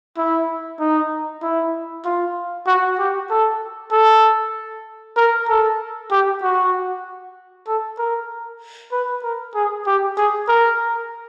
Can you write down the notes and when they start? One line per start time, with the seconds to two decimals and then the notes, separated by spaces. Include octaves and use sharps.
0.18 E4
0.80 D#4
1.42 E4
2.05 F4
2.67 F#4
2.99 G4
3.30 A4
3.92 A4
5.17 A#4
5.49 A4
6.11 G4
6.42 F#4
7.67 A4
7.98 A#4
8.92 B4
9.23 A#4
9.55 G#4
9.87 G4
10.17 G#4
10.49 A#4